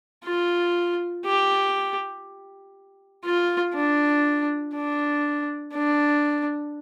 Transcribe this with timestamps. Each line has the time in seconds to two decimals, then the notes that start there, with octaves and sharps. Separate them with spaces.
0.25 F4
1.25 G4
3.25 F4
3.75 D4
4.75 D4
5.74 D4